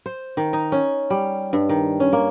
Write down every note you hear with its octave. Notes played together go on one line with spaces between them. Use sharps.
C5
D#3
D#4
C#4
G3
G2
D#3
C#4
A#3